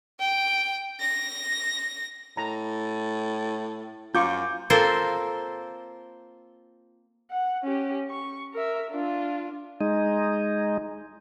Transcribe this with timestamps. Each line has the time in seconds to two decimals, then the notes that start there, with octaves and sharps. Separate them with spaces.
0.20 G5
1.00 A#6
2.37 A2 A#5
4.15 F#2 F4 C#6 D6 G6
4.70 A#3 C4 F4 A4 A#4 C5
7.31 F#5
7.64 C#4 G4
8.10 C#6
8.54 A#4 E5
8.91 D4 F4
9.81 G#3 D#4